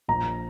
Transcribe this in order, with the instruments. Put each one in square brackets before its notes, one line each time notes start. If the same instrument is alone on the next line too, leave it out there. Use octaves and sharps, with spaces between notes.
[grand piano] A#1 A#5